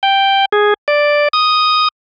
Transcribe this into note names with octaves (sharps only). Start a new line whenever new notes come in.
G5
G#4
D5
D#6